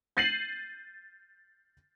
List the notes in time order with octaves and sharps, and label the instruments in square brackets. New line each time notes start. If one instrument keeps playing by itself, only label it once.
[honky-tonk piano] G6 A6 C7 D#7 F#7